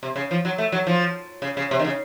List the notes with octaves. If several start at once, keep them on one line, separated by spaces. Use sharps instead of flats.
C3
C#3
F3
F#3
A3
F#3
F3
C#3
C#3
C3
D#3
C#3